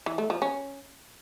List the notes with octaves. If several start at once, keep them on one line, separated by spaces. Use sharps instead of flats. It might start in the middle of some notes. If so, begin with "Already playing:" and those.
E3
A3
F3
C#4